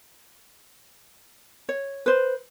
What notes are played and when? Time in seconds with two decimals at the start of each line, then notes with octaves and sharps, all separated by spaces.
1.69 C#5
2.06 B4 C5